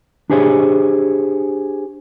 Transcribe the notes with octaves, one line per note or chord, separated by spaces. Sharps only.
D4 G4 G#4 C5 C#5